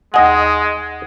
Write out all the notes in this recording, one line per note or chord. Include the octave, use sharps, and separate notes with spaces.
D#2 G#3 D#5 F#5 G#5